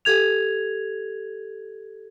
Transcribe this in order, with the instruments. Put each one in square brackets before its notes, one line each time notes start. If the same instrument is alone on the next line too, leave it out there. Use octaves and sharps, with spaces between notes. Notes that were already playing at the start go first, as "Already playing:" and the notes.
[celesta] G4 A4 G#6 F7